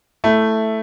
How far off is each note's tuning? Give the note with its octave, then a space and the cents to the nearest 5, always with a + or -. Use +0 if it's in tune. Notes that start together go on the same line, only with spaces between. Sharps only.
A3 +0 E4 +0